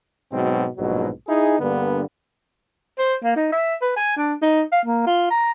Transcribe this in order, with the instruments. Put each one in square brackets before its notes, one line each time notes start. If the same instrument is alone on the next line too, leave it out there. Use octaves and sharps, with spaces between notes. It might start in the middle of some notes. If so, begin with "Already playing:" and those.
[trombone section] G#2 B2 F#3 C4
A#1 G#2 B2 F#3
D#4 E4 G#4
G2 D3 A#3 B3
[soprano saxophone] C5
A#3
D#4
E5
B4
G#5
D4
D#4
F5
A#3
F4
A#5